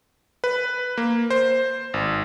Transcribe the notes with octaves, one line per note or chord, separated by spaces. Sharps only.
B4
A#3
C5
G#1